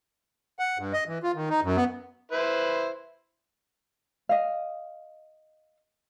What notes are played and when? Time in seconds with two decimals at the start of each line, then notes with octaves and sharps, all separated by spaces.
0.59 F#5
0.78 G2
0.93 D#5
1.07 E3
1.23 F4
1.35 D#3
1.50 D#4
1.63 F#2
1.76 B3
2.32 E4 B4 C5
4.29 D#5 F5